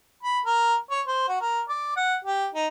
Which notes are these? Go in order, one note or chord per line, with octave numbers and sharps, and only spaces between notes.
B5
A#4
C#5
C5
F#4
A#4
D5
F#5
G4
D#4